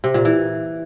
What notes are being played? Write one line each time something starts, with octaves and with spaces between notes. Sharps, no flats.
C3
A#2
E3